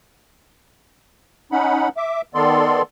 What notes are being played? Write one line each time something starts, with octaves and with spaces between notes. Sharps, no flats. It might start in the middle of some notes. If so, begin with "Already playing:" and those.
C#4 D#4 F#5 B5
E5 D6
D#3 B3 A4 D5 C6